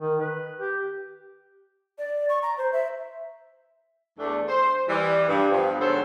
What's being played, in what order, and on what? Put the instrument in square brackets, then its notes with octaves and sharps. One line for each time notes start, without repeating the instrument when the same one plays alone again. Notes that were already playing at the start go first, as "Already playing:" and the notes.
[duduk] D#3
B4
G4
[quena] D5
C#6
A#5
C5
E5
[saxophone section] E2 A3 D4
C5
E3 G3
G2
G2 F3 B3
G#2 D3 B3 C#4 A4 C5